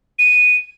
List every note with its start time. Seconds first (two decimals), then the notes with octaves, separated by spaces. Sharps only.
0.19 D#7